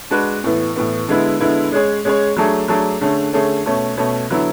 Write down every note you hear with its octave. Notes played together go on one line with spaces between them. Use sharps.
G#3 D4 F#4 B4
A2 E3 B3
A2 E3 B3
D3 G#3 B3 E4
D3 G#3 B3 E4
G#3 C#4 G#4 C#5
G#3 C#4 G#4 C#5
F#3 A3 D4 G#4
F#3 A3 D4 G#4
D3 A3 C#4 G#4
D3 A3 C#4 G#4
B2 A3 C#4
B2 A3 C#4
D3 F#3 B3 E4